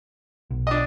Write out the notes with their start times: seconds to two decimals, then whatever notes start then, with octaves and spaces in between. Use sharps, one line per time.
0.50 B1
0.67 D4 D#5